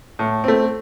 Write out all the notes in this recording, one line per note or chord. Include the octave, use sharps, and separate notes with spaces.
A2
A3 C4